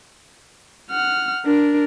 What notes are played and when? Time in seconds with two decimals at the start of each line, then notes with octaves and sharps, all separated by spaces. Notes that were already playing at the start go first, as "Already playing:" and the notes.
0.91 F#5 F6
1.45 D4 A#4